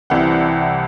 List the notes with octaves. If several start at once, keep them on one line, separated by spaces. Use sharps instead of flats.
C2 C3 E3 F#5